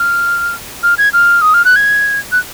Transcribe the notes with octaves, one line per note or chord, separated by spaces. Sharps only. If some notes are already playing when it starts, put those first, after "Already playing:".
Already playing: F6
F6
G#6
F6
D#6
F6
F#6
G#6
F#6